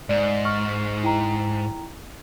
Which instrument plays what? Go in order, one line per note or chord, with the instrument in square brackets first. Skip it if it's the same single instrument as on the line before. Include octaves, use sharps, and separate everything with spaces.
[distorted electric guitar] G#2 [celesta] D5
[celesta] C#6 F6
E4 G5 A#5